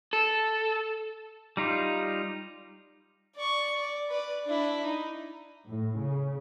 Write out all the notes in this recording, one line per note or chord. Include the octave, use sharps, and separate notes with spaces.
A4
G3 D#4 F4
D5 C#6
D5
B4 D5
D4 E4
D#4
A2
C#3